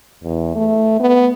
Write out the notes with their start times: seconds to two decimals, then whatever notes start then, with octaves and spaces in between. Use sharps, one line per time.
0.23 E2
0.56 A3
1.00 B3